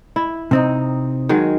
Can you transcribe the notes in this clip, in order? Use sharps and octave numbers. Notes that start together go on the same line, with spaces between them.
E4
C3 C4 D#4
D#3 F#3 G#3